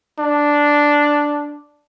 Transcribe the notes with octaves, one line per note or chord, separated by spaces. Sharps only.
D4